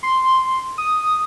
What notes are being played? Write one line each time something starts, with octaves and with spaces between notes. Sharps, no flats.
C6
D#6